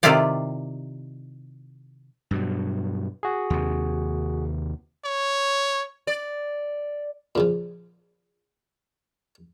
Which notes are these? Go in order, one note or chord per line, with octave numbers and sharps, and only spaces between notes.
C3 D#3 E4 F4 G4 D5
G2 B2 F#3
F#4 G#4
D#2 C3
C#5
D5
A#2 C#3 F3